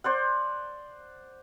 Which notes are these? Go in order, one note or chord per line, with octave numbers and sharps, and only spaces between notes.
C5 D5 F#5